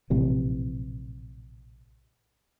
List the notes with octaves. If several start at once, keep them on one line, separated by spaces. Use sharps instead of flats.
A#1 A2 C3 E3